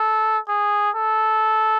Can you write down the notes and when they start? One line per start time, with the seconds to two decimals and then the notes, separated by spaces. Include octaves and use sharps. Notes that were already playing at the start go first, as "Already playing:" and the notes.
Already playing: A4
0.48 G#4
0.95 A4